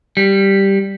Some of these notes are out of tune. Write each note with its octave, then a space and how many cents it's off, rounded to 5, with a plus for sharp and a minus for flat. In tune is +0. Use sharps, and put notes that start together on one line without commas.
G3 +0